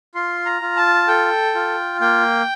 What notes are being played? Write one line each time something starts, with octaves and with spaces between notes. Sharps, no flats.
F4 C6
A#5
F4
A5
A4 G5
F4
A#3 G5